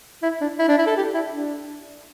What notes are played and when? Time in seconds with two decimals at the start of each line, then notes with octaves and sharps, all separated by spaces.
0.23 E4
0.41 D4
0.59 E4
0.68 D4
0.78 E4
0.87 A4
0.97 G4
1.14 E4
1.33 D4